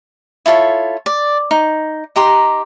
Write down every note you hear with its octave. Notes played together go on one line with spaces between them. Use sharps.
E4 F4 A4 C#5
D5
D#4
D#4 G4 A#5 C6